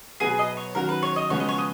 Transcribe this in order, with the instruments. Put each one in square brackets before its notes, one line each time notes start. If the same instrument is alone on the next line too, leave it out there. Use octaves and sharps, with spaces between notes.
[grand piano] B2 F#3 B3 [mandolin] G#4
[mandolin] D#5
C#5
[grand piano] D#3 F#3 C#4 F#4 [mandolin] A#4
[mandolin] B4
C#5
D#5
[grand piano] C#3 F3 G#3 B3 F#4 [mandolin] C#5
[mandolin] D#5
C#5
D#5